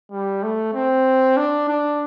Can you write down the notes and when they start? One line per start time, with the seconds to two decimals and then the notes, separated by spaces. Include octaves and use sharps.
0.11 G3
0.43 A3
0.74 C4
1.37 D4
1.69 D4